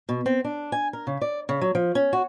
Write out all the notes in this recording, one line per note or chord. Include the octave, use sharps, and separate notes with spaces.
B2
C4
D4
G#5
A#4
C#3
D5
C#3
F#3
F3
C#4
F#4